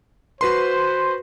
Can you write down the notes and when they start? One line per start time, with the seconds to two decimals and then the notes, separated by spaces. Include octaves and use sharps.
0.41 F#4 B4 C5 C6